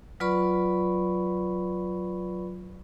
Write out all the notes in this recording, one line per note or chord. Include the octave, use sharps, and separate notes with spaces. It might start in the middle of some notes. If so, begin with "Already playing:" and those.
F#3 F4 B4 D5 B5 C#6